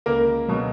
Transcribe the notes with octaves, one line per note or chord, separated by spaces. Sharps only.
C#2 A#3 A#4
B2 F#3